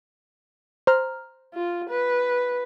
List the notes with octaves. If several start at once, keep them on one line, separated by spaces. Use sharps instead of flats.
C5 A#5 F6
F4
B4